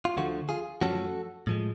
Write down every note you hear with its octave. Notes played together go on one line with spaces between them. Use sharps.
F4
D2 D3 F3 A3 F#4
F4 G#4
F#2 F3 A3 C#4 F#4 A4
A2 F3 G#3